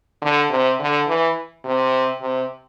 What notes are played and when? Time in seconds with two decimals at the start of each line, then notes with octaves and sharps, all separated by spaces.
0.22 D3
0.50 C3
0.79 D3
1.08 E3
1.65 C3
2.21 C3